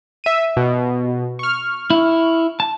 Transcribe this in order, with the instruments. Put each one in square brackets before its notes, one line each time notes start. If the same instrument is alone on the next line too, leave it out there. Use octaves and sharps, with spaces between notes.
[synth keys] E5 D#7
B2
C#6 F6
[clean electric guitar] E4
A5